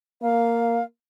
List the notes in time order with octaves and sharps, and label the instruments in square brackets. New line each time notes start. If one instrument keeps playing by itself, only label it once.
[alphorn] A#3 [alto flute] F5